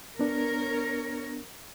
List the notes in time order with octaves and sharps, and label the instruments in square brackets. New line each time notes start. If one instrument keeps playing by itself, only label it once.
[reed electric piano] B3 D4 [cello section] A#4 C#5